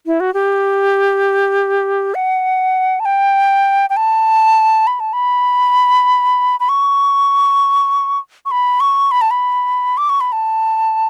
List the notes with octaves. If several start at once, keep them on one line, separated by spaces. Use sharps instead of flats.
E4
F#4
G4
F#5
A5
G5
G5
A5
B5
A5
B5
B5
C#6
C#6
B5
C#6
B5
A5
B5
D6
C#6
B5
A5